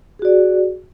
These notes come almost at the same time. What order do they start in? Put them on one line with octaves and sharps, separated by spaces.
G#4 F#4 D5